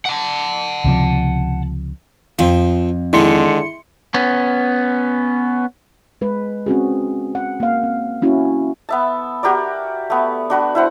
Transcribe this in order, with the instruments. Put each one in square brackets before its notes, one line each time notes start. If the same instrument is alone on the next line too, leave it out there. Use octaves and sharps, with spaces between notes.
[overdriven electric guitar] F#5 A5
[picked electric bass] C#2 C3 F3
[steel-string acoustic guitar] F2 [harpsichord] F3 C4
[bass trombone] D3 [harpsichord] D#3 G#3 D#4 [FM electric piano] E4 C6 C#7
[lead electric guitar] B3 C#4
[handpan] G#3 B4
C4 C#4 F#4 G#4
F#5
A#3 F5
C4
A#3 C#4 E4 F#4
[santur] B3 E5 A5
F#4 G4 A#4 D5
A3 B3
D4 F#4 B4
E4 C5 F#5